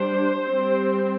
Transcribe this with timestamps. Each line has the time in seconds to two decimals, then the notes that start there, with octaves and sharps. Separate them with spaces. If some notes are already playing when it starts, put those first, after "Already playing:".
Already playing: G3 D4 C5
0.46 G3 C4